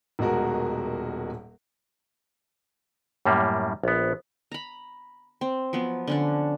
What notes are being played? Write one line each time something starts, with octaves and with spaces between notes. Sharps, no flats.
D#1 B2 G#3 F#4 A#4
F#2 A2 G3 A#3
A#1 B3
A#5 B5
C4
F3 F#3 B3
D3 C#4 D4